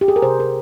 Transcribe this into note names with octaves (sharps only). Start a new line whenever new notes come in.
G4
G#4
A#4
C3 C5
A#4